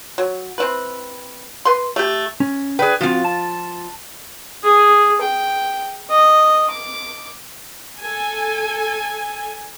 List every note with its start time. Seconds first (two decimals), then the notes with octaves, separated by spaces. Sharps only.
0.18 F#3
0.58 C4 E4 B4
1.65 B4 C6
1.96 A3 G4
2.40 C#4
2.79 G#4 B4 D5 G5
3.01 F3 C4 F4 F#4
3.24 A5
4.63 G#4
5.21 G5
6.10 D#5
6.70 D6
8.00 A4 G#5